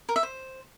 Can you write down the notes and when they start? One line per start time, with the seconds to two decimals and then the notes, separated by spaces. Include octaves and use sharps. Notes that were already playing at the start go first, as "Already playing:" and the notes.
0.09 A#4
0.16 E5
0.23 C5